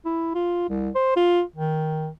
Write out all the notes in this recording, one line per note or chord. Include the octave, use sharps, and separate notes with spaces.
E4
F4
C2
C5
F4
D#3